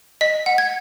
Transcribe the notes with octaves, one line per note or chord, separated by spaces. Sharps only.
D#5 B6
F#5
G#6